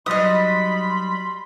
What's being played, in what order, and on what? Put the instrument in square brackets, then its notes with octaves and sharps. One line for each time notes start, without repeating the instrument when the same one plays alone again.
[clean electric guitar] F#3 G3 D#4 [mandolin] D#5 D#6 [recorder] B5 [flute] C6